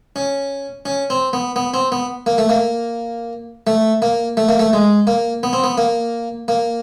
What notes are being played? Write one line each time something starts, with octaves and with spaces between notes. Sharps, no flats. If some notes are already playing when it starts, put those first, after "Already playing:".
C#4
C#4
C4
B3
B3
C4
B3
A#3
A3
A#3
A3
A#3
A3
A#3
A3
G#3
A#3
B3
C4
B3
A#3
A#3